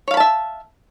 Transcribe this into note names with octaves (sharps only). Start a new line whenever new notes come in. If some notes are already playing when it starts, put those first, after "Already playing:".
C#5 E5 F5 A5 B5